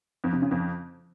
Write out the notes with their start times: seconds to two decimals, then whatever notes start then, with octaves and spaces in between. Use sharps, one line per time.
0.24 F2
0.33 C3
0.42 C#3
0.51 F2